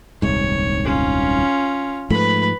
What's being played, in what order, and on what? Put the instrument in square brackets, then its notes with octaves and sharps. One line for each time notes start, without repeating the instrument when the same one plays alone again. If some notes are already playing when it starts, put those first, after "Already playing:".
[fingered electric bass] D#1 C2 G#2 [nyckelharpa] C#5
[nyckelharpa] C#4 F4
[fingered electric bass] G#2 F3 A3 [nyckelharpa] B4 B5